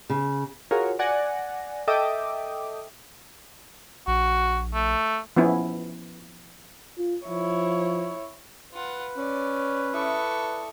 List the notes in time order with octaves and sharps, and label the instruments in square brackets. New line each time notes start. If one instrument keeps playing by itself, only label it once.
[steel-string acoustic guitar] C#3
[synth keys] F4 F#4 G#4 A#4 C#5
D5 F#5 G#5 A#6
A4 D#5 E5 G5 D6 D#6
[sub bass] A#1 [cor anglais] F#4
[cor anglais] A3
[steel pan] F3 B3 C#4 E4
[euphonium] F4
[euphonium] F3 [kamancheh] E4 C#5
[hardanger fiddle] F4 F#5 [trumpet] B4
[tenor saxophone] C#4 [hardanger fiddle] D5
[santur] E4 D5 D#6 [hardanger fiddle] A4 C#6